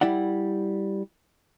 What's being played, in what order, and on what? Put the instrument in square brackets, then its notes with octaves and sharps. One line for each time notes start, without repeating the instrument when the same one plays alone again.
[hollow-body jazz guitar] G3 E4 D5 F#5